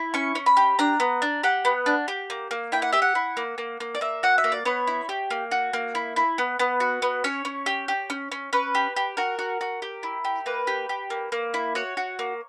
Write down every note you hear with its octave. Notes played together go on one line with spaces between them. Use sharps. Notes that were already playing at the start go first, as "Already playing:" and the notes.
Already playing: E4
C#4 C#6
C#4
B5
G4
D4 A#5
B3
D4
G4 F#5
B3
D4
G4
A#3
A#3
E4 G5
F#5
G4 E5
F#5
E4
A#3
A#3
A#3
D5
A#3 E5
F#4 F#5
E5
A#3
D5
B3 C#5
E4
G4
A#3
F#4
A#3
E4
E4
B3
B3
F#4
B3
C#4 C#5
C#4
G4
G4
C#4
C#4
C#4 B4
G4
G4
F#4 A#4
F#4
F#4
G4
E4
G4
A#3 B4
G4
G4
A#3
A#3
E4
F#4 C#5
F#4
A#3